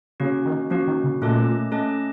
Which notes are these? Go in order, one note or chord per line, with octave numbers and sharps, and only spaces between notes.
C#3 A#3 C#4 F#4
D#3
F3 A#3 C#4 F#4
D#3
C#3
A#2 A3 C#4 A4 D#5 A5
A3 C#4 A4 D#5 A5